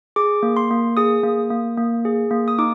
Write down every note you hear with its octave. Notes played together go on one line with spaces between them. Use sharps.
G#4 D6
A#3
C6
A#3
G#4 D#6
A#3
A#3
A#3
G#4
A#3
D#6
D#4 D6